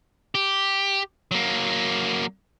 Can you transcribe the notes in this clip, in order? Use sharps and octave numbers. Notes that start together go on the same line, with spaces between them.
G4
F#3 A#3